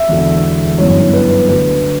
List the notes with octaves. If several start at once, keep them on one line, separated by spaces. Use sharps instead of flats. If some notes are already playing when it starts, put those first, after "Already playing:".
Already playing: E5
E1 E2 D3
G1 F#2 E3 C#5
B4
D2 D3 B4